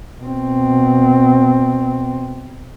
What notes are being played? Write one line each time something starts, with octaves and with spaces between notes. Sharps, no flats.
B2 C4